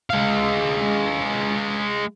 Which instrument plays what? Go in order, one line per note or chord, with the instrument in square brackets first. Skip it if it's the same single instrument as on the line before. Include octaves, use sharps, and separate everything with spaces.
[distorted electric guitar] G#3 F5